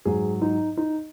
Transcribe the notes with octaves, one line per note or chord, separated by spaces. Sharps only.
G#2 F#3 G#4
D#4
D#4